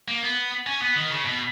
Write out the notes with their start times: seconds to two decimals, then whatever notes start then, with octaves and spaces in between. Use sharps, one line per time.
0.08 A#3
0.22 B3
0.66 C#4
0.81 B3
0.96 D#3
1.11 C#3
1.25 B2